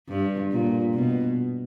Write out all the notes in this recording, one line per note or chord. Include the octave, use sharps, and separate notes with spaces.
G2
A#2
B2